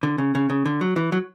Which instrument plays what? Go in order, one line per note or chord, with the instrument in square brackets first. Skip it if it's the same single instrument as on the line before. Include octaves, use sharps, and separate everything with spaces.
[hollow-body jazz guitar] D3
C#3
C#3
C#3
D3
F#3
E3
F#3